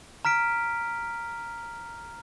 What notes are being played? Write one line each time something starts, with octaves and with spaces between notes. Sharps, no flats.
A#5 F6 B6 D7